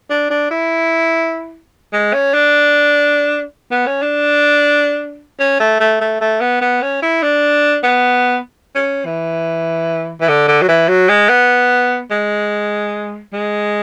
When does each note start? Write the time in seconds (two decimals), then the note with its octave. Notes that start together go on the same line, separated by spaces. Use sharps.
0.10 D4
0.30 D4
0.51 E4
1.93 G#3
2.13 C#4
2.34 D4
3.71 B3
3.87 C#4
4.02 D4
5.39 C#4
5.60 A3
5.80 A3
6.01 A3
6.21 A3
6.41 B3
6.61 B3
6.82 C#4
7.02 E4
7.23 D4
7.83 B3
8.75 C#4
9.06 E3
10.21 E3
10.28 D3
10.48 D3
10.62 F#3
10.68 E3
10.89 F#3
11.09 G#3
11.29 B3
12.11 G#3
13.33 G#3